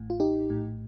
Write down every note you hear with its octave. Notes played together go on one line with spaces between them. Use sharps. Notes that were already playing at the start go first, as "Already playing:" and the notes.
Already playing: A1 A2
F4
D#4 G4
A#1 A2